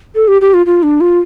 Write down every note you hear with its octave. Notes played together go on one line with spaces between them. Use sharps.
A4
G4
G4
F4
F4
D4
F4